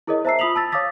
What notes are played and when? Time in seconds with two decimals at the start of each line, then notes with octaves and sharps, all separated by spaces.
0.07 E4 G#4 A#4 C#5 D#5
0.25 C5 E5 A5 A#5 E6 C7
0.39 F4 B5 D#6 B6 F7 F#7
0.56 A5 E6 A6
0.72 C#5 F5 D6 D#6 A6 B6